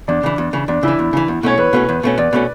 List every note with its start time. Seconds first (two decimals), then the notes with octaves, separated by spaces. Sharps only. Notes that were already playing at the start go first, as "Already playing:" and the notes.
0.08 E2 D4
0.23 C#3 E3
0.38 E2
0.53 C#3 E3
0.68 E2 D4
0.83 C#3 E3 E4
0.99 E2
1.13 C#3 E3
1.28 E2
1.43 B2 A3 C#4 C#5
1.58 E2 B4
1.73 B2 A3 C#4
1.89 E2
2.03 B2 A3 C#4
2.18 E2 D5
2.33 B2 A3 C#4